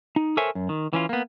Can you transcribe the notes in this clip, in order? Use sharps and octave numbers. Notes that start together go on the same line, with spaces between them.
D#4
A4 A#4 C5 C#5 E5 G#5
F#2
D#3
E3 C#4 F4
A#3 B3